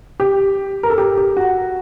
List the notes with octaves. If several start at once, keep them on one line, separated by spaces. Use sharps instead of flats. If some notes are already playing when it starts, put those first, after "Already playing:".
G4
A#4
A4
G4
G4
F#4